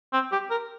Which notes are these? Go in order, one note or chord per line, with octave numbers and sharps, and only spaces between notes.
C4
G4
A#4